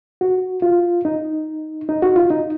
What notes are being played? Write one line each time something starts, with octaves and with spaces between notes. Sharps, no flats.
F#4
F4
D#4
D#4
F#4
F4
D#4